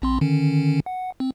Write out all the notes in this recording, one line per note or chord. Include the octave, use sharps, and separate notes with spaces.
A#1 C4 C6
D3 D#3 C#4
F#5
C4